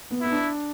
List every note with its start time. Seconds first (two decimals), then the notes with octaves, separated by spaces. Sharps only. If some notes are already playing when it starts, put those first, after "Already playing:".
0.11 B3
0.21 B3 E4
0.32 D4